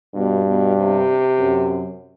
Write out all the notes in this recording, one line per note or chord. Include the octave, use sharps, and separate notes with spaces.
G2 B2
B2
C3
F#2